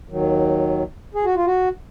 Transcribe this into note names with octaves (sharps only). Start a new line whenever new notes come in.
D#2 D#3 F#3
G#4
F#4
F4
F#4